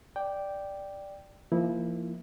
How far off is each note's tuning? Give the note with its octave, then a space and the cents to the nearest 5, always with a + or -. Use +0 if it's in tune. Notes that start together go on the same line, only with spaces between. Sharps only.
D5 +0 G5 +0
F3 -30 A#3 +0 E4 -20